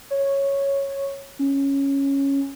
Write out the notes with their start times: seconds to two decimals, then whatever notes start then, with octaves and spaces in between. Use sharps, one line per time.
0.10 C#5
1.39 C#4